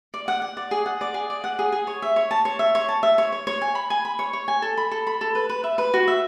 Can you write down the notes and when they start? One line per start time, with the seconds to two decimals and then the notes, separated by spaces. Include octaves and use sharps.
0.14 D5
0.28 F#5
0.42 F#5
0.57 D5
0.71 G#4
0.86 F#5
1.01 D5
1.14 G#4
1.30 D5
1.44 F#5
1.59 G#4
1.72 G#4
1.87 C#5
2.02 E5
2.16 C#5
2.31 A5
2.45 C#5
2.59 E5
2.75 C#5
2.89 A5
3.03 E5
3.18 C#5
3.32 C#5
3.47 C#5
3.62 G#5
3.75 B5
3.90 G#5
4.05 B5
4.19 C#5
4.33 C#5
4.48 G#5
4.62 A4
4.77 B5
4.91 A4
5.07 B5
5.21 A4
5.35 B4
5.49 B4
5.64 E5
5.78 B4
5.94 F#4
6.08 E5